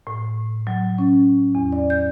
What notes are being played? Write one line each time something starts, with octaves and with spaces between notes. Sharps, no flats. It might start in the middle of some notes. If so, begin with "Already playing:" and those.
A2
F#3
C#4
E2
D5
G6